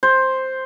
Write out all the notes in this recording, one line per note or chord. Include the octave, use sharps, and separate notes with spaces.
C5